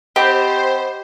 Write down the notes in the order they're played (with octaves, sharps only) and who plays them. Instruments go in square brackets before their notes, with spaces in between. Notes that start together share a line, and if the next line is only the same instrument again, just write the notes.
[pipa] C4 [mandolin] G4 [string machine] C5 [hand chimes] D#5 F#5 B5